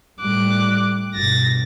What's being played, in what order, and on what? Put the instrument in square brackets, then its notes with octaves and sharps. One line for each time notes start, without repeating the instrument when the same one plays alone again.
[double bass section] A2 G3 [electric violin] D6 F#6
[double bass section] G1 B2 [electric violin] A6 A#6